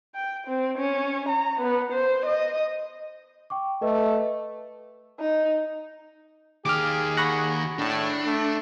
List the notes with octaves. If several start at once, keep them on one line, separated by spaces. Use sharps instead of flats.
G5
C4
C#4
A#5
B3
C5
D#5
G5 C#6 D6
A3 B4 D#5
D#4
D#3 G4 G#4 D6 F6
F#5 B5 C#6 A#6
A2 D4
A3